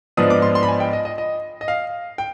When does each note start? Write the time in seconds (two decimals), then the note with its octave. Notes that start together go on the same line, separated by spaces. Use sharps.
0.17 G#2 F3 B3 D4 D#6
0.30 D6
0.42 C6
0.55 C6
0.63 B5
0.68 G#5
0.80 G5
0.93 D#5
1.05 D#5
1.18 D#5
1.61 D#5
1.68 F5
2.18 G5